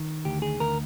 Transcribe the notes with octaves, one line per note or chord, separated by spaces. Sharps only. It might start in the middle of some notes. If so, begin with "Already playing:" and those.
Already playing: D#3
D2 G4
G#4
D2 A#4